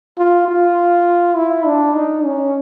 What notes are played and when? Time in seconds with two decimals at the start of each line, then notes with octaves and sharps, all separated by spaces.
0.18 F4
0.48 F4
1.37 E4
1.66 D4
1.95 D#4
2.25 C#4